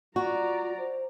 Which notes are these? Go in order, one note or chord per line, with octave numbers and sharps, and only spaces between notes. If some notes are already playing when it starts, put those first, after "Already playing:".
F4 F#4 D5 A#5
C5